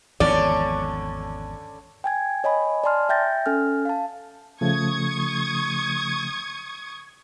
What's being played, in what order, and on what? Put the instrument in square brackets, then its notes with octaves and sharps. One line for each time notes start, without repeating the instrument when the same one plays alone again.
[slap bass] G#1 E2 F3 [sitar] D3 C#4 [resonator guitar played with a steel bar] D5
[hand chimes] G5 G#5 G#6
C#5 D#5 G#5 B5
D5 G#5 A5 C6 F6
E5 G5 G6 A6 A#6
C#4 A4 G#5 F6
F5 A5
[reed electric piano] C#3 F3 A3 [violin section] C#6 D#6 G#6